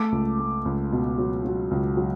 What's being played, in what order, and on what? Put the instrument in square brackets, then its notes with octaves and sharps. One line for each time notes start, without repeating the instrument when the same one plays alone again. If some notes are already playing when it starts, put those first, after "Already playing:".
Already playing: [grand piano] A3 D6
C#2
A3
C#2
B2
F#3
F#3
C#2
F#3